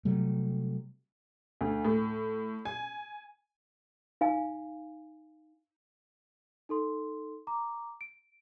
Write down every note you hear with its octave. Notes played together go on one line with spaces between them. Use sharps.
C3 F#3 G3 A3
D2
A2
G#5
D#4 F5 G#5
D#4 A4 C6
A#5 D6
D7